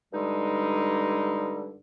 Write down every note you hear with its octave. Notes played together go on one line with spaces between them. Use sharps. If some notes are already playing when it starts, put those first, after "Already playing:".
G2 D3 G3 G#3 D#4